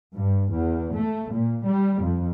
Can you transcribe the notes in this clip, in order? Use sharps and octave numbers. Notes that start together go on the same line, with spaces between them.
G2
E2
A3
A#2
G3
F2